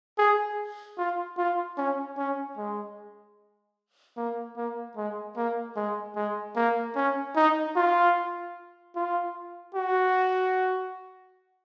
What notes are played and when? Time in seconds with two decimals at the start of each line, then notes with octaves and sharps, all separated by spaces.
0.18 G#4
0.98 F4
1.37 F4
1.78 C#4
2.18 C#4
2.57 G#3
4.17 A#3
4.57 A#3
4.97 G#3
5.36 A#3
5.76 G#3
6.16 G#3
6.56 A#3
6.96 C#4
7.36 D#4
7.76 F4
8.95 F4
9.75 F#4